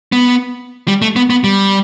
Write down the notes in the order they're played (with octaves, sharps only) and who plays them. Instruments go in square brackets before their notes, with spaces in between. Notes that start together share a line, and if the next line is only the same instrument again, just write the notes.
[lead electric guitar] B3
G3
A3
B3
B3
G3